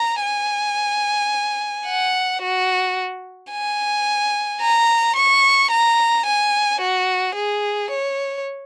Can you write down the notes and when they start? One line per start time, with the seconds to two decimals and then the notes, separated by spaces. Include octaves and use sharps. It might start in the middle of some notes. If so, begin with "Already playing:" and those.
Already playing: A#5
0.23 G#5
1.87 F#5
2.42 F#4
3.51 G#5
4.61 A#5
5.16 C#6
5.71 A#5
6.26 G#5
6.81 F#4
7.35 G#4
7.90 C#5